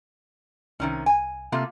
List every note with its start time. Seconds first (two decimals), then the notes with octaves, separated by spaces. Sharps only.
0.80 C2 C3 D#3 C#4
1.06 G#5
1.52 C3 A3 A#3 F4